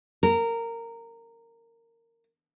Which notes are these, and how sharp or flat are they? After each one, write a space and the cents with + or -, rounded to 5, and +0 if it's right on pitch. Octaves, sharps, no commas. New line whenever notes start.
A#4 -15